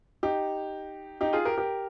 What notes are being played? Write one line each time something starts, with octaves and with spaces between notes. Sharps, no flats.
D#4 G4
D#4 G4
F4 G#4
G4 A#4
G4 A#4